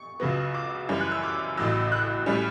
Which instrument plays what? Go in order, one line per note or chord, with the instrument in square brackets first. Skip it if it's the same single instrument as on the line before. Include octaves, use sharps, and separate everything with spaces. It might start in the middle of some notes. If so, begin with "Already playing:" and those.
Already playing: [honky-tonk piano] C#6
C#2 C#3 F#3 B3
D6
F#2 E3 G3 C#4
F#6
E6
D6
A1 A2 F#3 E6
F#6
A2 G3 C#4